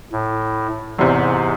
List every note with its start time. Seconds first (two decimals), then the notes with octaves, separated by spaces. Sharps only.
0.12 A2
0.99 E2 G#2 C3